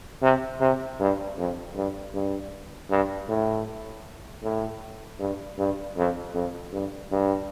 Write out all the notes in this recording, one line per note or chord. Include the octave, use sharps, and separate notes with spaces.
C3
C3
G2
F2
G2
G2
G2
A2
A2
G2
G2
F2
F2
G2
G2